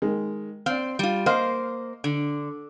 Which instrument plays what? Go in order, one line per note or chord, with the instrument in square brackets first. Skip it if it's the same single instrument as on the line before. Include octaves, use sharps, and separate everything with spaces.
[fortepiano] D#3 G#3
[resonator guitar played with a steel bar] C4 [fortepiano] D5 F5
[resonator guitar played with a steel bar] G3 F4
[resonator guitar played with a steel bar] A#3 C5 [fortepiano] D#5 F5
[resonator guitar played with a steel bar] D3